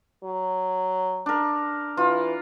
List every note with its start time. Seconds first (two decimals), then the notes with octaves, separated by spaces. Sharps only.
0.24 F#3
1.26 D4 A#4
1.97 E3 F4